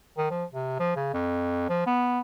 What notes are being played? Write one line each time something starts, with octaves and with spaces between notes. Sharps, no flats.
D#3
F3
C3
F3
C#3
F2
F3
B3